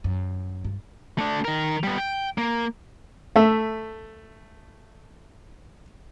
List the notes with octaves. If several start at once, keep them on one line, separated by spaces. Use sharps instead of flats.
F#2
G2
A3 D4
D#3 A#4
G3 B3
G5
A#3
A3 E5